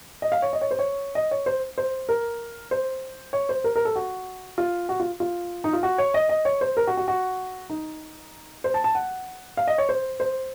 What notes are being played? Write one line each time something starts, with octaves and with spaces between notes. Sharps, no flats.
D#5
F5
C#5
D#5
C#5
C5
C#5
D#5
C#5
C5
C5
A#4
C5
C#5
C5
A#4
A#4
A4
F#4
F4
F#4
F4
F4
D#4
F4
F#4
C#5
D#5
D#5
C#5
C5
A#4
F#4
F#4
F#4
D#4
C5
A5
A5
F#5
F5
D#5
C#5
C5
C5